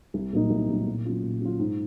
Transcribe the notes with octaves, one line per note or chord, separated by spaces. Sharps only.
C2
A#2 F#3 A#3 D#4
C2
A#2 F#3 A#3 D#4
A#2
F#3 C#4 F4
A#2
F#3 C#4 F4
G#2